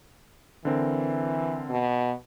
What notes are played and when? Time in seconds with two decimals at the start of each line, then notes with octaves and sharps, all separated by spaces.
0.65 D3 E3 C4 A#4
1.70 B2